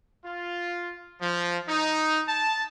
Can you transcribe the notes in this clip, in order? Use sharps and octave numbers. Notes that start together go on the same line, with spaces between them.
F4
F3
D#4
A5